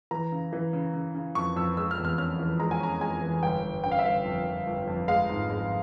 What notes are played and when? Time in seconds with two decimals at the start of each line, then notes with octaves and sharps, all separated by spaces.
0.11 E3 A#5
0.32 C#3
0.53 E3
0.73 C#3
0.94 C#3
1.15 C#3
1.35 F2 C#6
1.56 F2 E6
1.77 G#3 E6
1.91 F6
1.98 E2
2.05 F6
2.18 C#4 F6
2.39 E3
2.60 G#3 A#5
2.71 G#5
2.80 C#4 A#5
3.01 G#3 G#5
3.22 E3
3.42 G1 G5
3.63 G1
3.84 C#3 G5
3.92 F5
3.99 E5
4.04 G1 F5
4.25 F2
4.46 G1
4.67 G1
4.87 F2
5.08 G#3 F5
5.29 G#2
5.50 G#3